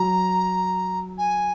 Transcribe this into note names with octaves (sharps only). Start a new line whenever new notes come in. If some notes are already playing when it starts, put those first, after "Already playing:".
Already playing: F#3 A#5
G#5